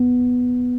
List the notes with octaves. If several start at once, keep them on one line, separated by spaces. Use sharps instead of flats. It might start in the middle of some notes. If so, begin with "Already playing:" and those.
Already playing: B3